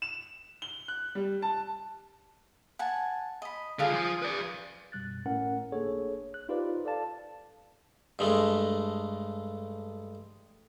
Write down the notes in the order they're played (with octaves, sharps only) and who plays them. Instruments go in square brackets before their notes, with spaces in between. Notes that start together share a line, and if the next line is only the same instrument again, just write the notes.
[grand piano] E7
G7
F#6
G3
A5
[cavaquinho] F#5 G#5 A5
D#5 B5
[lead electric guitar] D3 F4 [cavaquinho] G#4 F5 D#6
[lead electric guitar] F3
B4 D5
[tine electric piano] F#2 B2 G3 F#6 A6
G#1 A2 A3 C#4 A#4 F#5
G1 A#3 D4 G#4 A4 C#5
A1 F#6
D#4 F4 G4 B4 C5 D5
A4 D5 F5 A5
[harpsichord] G2 G#3 A3